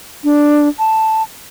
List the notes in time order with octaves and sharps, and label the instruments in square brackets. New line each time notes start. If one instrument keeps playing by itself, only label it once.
[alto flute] D4
A5